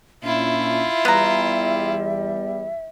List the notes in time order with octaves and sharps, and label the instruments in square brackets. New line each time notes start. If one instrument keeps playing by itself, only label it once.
[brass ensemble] A#2 C#4 D4 [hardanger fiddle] E4 F4 [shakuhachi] E5
[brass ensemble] E2 G3 [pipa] B3 A#5